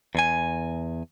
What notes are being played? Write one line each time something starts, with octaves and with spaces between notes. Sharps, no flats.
E2 G#5